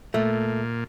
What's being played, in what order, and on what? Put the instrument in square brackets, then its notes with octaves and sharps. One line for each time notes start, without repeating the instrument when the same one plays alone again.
[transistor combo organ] A#2 [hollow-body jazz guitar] A3